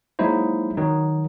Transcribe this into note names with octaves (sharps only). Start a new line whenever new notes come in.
F#3 G#3 A#3 D#4 E4 C5
D#3 F#3 D#4